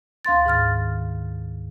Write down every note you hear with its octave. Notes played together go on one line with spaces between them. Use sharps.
D2 F5 C6 A6
G#2 D#3 F6 A6